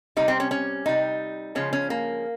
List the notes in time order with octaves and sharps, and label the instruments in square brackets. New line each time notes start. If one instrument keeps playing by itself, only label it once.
[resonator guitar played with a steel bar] C3 G3 D#4
C4
C#4
C#4
C3 G3 D#4
C#3 F3 G#3 C#4
C#4
A#3